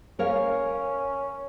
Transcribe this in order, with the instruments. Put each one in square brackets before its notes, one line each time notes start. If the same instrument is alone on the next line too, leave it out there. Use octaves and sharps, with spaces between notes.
[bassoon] C#4 [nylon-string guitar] A#4 C#5 F5